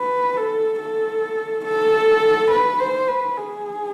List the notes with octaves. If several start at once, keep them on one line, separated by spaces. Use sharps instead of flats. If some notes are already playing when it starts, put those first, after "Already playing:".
Already playing: B4
A4
A4
A4
B4
C5
B4
G#4